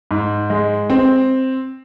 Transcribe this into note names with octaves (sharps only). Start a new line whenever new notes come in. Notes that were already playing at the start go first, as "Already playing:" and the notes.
G#2
G#3
C4